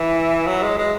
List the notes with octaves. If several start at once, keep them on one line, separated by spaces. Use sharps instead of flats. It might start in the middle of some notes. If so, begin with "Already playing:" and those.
Already playing: E3
F#3
G#3
G#3